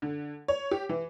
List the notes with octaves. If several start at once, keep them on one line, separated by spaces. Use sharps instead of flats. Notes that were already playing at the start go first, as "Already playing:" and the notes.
D3
C#5
G4
E3